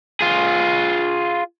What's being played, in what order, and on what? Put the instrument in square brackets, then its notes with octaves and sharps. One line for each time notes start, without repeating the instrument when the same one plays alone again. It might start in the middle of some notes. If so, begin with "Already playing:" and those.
[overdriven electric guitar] F4 G#4